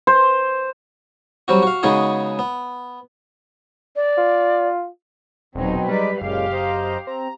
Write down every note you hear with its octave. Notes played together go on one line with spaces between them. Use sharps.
C5
F#3 G3 C4 F#4
F#4 F5
C#3 G#3 B3 D#4 F#4 G#4
B3
D5
F4
D#1 B2 F#3 C4 D#4
G3 G#3 D#4 B4 D5
F#1 A#2 C#3 G#3 G4 F5
C5 D#5 A#5
C4 A#5